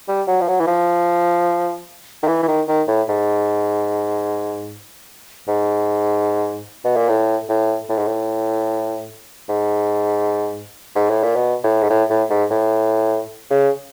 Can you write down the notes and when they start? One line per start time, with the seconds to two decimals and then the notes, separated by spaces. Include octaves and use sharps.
0.08 G3
0.27 F#3
0.41 F3
0.48 F#3
0.60 E3
0.67 F3
2.23 D#3
2.28 E3
2.43 E3
2.48 D#3
2.68 D#3
2.88 A2
3.09 G#2
5.48 G#2
6.84 B2
6.96 A#2
7.09 A2
7.49 A2
7.89 A2
7.98 G#2
8.07 A2
9.49 G#2
10.95 G#2
11.10 A2
11.23 A#2
11.36 B2
11.63 A2
11.83 G#2
11.90 A2
12.10 A2
12.30 G#2
12.50 A2
13.50 C#3